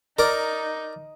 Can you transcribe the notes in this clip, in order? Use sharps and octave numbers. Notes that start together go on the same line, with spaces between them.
D#4 A#4 D5